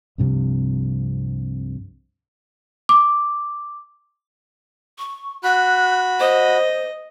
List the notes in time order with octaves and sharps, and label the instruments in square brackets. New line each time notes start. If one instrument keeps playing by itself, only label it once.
[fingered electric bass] C2 G2 C3 F3
[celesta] D6
[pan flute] C#6
[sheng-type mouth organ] F#4 B5 [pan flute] F#6
[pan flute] C5 [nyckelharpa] D#5